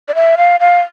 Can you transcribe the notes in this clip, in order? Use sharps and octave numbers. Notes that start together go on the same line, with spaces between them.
D5
E5
F5
F5